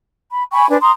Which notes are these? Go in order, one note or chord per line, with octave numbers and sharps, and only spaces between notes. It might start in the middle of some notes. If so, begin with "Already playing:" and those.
B5
G5 G#5 B5 C#6
D4 B4 C5 G#5
A#5 C6 D#6